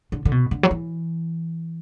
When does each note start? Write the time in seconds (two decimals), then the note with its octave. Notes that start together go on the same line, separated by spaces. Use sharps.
0.12 D3
0.25 D3
0.32 B2
0.51 D3
0.63 F#3
0.71 E3